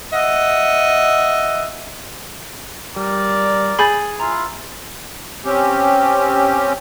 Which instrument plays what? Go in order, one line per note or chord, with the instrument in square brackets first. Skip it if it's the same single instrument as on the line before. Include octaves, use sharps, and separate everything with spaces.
[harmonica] D#5 E5 F#5
[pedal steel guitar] G3 [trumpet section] A#4 D5
[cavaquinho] G#4 [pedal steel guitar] G#5 [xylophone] B5 G6 A6
[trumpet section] E4 F4 [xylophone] A#5
[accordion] C4 C#4 G4